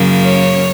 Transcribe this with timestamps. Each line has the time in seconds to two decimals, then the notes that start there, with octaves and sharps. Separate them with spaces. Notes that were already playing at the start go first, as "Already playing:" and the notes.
Already playing: F#2 C#3 F#3 A#3
0.24 C#5